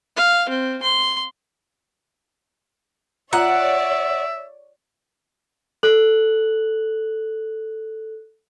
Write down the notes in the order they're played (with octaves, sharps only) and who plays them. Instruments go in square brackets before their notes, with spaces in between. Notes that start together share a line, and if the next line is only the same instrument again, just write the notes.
[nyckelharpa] F5
C4
C6
[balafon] F4 A#5 [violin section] C#5 D5 [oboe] E5 [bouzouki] F#5
[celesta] A4 F#6 F#7